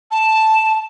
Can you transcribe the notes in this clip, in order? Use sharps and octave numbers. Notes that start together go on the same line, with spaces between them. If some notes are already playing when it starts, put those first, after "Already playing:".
A5